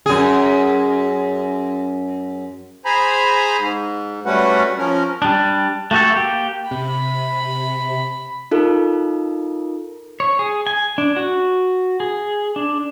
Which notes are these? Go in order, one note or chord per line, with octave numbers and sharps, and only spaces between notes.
F#2 G#4
G#4 C5 G#5 A#5 B5
G#2
G3 A3 C#4 F#4 B4 F#5
F3 C#4 A#4
G3 D4
A3 F#4 G4 A4
A#3 G4
C3 B5
D#4 F4 A4 A#4
C#5
G#4
G#5
D4
F#4
G#4
D4